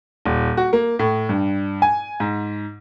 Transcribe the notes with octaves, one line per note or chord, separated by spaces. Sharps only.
D#1
F#4
A#3
A2
G2
G#5
G#2